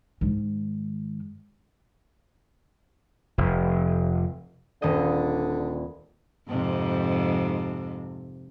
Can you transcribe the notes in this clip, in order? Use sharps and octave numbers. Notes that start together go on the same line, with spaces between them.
G#2 D#3
F1
D#1 D3 D#5
F2 G#2 C3